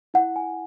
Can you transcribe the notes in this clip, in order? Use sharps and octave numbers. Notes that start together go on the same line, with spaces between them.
E4 F#5
G#5